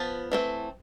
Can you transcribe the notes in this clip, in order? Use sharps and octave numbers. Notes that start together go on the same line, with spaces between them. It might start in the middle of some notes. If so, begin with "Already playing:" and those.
Already playing: F3 B3 A5
E3 A3 C4